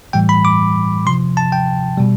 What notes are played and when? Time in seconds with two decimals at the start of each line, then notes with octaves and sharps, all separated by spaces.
0.13 A2 E3 G3 G5
0.29 B5
0.45 D6
1.06 C3 F3 C6
1.37 A5
1.52 G5
1.98 B2 G3